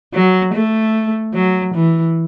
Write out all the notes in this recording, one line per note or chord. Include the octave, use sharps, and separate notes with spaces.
F#3
A3
F#3
E3